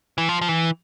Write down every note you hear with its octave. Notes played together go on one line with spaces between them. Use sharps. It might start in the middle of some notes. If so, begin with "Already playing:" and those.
E3
F3
F3
E3